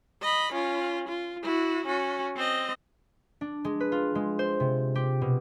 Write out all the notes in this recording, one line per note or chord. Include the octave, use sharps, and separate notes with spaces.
D#5 B5
C#4 F4
F4
E4 F#4
C#4 F#4
C4 D#5
D4
G#3
B4
F4
G#3
C5
C3
G4
B2